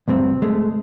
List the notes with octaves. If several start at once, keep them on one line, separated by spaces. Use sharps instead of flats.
D2 G2 C3 C4
G#3 A3